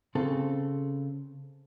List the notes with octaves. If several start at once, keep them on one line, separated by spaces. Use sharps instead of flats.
C#3 C4 A4